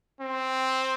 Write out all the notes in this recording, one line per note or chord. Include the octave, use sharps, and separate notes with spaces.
C4